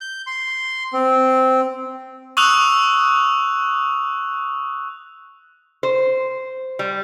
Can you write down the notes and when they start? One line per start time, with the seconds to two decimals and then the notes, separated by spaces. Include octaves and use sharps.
0.01 G6
0.27 C6
0.93 C4
2.37 C#6 D#6 E6 F#6 F7
5.83 C5
6.79 G3